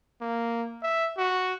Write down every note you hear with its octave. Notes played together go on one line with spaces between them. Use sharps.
A#3
E5
F#4